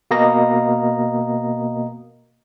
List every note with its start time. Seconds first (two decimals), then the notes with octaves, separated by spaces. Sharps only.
0.11 B2 A#3 D#5 A#5 A#6